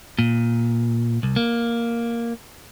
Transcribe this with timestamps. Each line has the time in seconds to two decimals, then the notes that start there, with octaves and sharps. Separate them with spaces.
0.19 A#2
1.23 C2
1.36 A#3